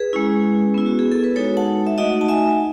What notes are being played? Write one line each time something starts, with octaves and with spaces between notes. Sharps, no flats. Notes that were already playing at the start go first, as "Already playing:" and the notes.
Already playing: G#4 B4
G#3 C#4 E4
B3 E4
F#4
G#4
A4
B4
G#3 D#4 F#4 A4 C#5
F#5 A5
E5
A3 D#4 F#4 D#5 F#5
A5
E5 G#5